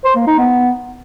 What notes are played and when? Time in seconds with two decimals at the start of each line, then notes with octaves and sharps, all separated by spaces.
0.04 C5
0.16 A#3
0.27 D#4
0.38 B3